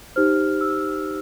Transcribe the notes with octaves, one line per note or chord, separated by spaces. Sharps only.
D#4 G4 C5 F6
E6